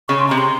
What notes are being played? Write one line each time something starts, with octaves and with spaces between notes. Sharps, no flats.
C#3 C#6
C6
C3 A#5
C6